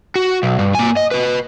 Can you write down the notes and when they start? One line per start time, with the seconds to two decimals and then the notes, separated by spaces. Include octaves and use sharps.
0.16 F#4
0.43 B1
0.59 G2
0.75 A#3 G#5
0.97 D#5
1.11 B4 D#5